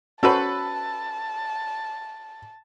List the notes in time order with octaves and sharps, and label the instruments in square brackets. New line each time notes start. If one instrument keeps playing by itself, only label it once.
[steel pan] C#4 F#4 C5 [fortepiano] A4 B4 [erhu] A5